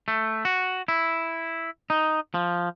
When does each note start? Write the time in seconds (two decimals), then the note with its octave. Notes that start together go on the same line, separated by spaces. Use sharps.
0.08 A3
0.45 F#4
0.88 E4
1.90 D#4
2.34 F3